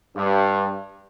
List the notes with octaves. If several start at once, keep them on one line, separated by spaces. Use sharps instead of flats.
G2